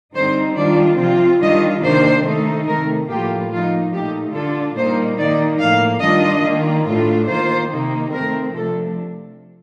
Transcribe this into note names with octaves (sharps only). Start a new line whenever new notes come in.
D3 G3 C4 D#4 C5
D#3 G3 D4 F4 D5
C3 F3 C4 F4
D#3 G3 D4 F4 D#5
C3 D#3 A#3 D4 C5
D#3 A3 D#4
C3 D#3 A3 A#4
A2 F3 A#3 F4 G4
F3 A#3 D#4 F4
A#2 A3 D#4 G4
D3 G3 D4 F4 A4
A#2 G3 A#3 D#4 C5
D#3 A#3 D#4 D5
A2 F3 A#3 F5
D#3 G3 D4 F4 D#5
D#3 A#3 F4
A2 A3 D4 F4
D#3 A#3 F4 C5
C3 D#3 A#3 D#4
D#3 A3 C4 A#4
C3 F3 A3 D4 A4